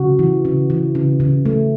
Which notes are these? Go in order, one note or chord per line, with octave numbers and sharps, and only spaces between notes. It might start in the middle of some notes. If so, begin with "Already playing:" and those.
Already playing: C#3 F#4
E3
C#3
E3
C#3
C#3
A3